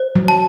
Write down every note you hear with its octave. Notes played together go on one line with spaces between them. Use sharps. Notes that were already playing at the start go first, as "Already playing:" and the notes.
Already playing: C5
F#3
A5